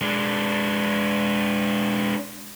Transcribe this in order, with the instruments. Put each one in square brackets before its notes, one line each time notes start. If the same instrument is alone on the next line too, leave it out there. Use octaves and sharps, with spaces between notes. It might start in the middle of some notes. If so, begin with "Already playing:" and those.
[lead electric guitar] G#3 D4